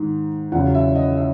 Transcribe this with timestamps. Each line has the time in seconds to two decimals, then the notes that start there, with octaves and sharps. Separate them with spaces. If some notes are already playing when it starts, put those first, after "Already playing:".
Already playing: G#2 D#3
0.52 E2 C#3 F#3 F#5
0.75 E5
0.95 D#5
1.17 E5